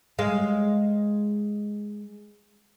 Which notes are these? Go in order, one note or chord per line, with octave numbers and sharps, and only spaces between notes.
G#3 F5